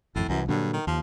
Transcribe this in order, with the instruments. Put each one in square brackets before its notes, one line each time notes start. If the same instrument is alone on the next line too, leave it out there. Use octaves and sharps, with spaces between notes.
[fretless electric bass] G#1 F2 [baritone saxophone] A2
[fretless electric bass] C2 E3 [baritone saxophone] F#2
[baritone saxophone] G2 [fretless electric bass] A#2 D3 F#3
[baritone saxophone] D#3
[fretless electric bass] D#2 [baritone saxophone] F3